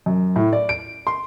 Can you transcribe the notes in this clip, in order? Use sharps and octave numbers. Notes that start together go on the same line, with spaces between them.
F#2
A2
D5
D7
C6